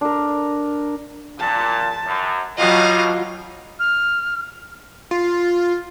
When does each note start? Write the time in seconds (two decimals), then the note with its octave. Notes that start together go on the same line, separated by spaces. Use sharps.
0.01 D4 A#4
1.39 A#2 A5
2.06 F#2
2.58 B2 F#3 G3 F4 D#5 F5
3.80 F6
5.11 F4